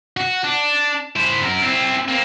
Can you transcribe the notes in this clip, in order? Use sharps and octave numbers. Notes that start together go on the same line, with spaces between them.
F#4
D4
E4 C5
F#2 A#4
C4 E4
A#3 C4